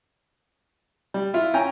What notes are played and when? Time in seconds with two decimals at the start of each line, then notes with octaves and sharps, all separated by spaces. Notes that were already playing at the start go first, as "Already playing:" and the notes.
1.14 G3
1.34 E4 F4
1.54 C#4 G5 G#5 A#5